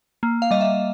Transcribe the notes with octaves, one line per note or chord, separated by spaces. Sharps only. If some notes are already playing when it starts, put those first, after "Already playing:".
A#3
F5
G3 D#5
E5